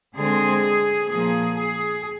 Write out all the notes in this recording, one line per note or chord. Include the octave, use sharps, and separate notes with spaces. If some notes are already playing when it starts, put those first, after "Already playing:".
D3 G#3 C4 G#4
A#2 F3 A#3 G#4
G#4